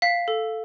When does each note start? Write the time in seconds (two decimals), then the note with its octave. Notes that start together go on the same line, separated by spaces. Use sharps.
0.02 F5 B6
0.28 A4